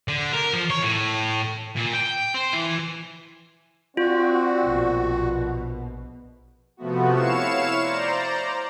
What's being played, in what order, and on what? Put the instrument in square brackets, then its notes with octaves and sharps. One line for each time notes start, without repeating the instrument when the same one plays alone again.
[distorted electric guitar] D3
A#4
F3
C#5
A2
A#2
G5
C5
E3
[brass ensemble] C4 D5 [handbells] F4 [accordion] F#4
[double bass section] A#1 B2
[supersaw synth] C3 F3 A3 B3 F#4
E4 C#5 F5 C#7 E7
C5 D5 A#5